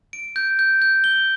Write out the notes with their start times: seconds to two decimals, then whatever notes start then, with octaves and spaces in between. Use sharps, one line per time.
0.13 D7
0.36 G6
0.59 G6
0.82 G6
1.04 G7